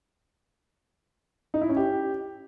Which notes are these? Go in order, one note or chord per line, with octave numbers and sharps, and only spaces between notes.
D#4
E4
C#4
G4